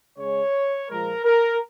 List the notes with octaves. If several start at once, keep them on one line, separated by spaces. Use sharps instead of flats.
C#3 G#3 C#5
A#2 F3 G#3 A#4
A#4